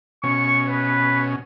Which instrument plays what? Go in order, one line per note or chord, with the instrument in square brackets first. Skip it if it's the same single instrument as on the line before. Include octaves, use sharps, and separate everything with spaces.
[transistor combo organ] B2 C#4 [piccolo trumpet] C#6
[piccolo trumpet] B4